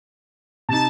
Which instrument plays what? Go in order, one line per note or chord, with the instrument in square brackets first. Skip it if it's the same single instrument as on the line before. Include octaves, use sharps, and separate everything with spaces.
[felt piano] C3 D#4 [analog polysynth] A5